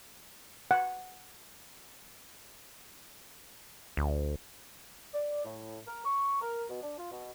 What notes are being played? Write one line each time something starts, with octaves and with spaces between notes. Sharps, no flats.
F#5
D2
D5
A2
A#4
C#6
A#4
B2
D4
F4
B2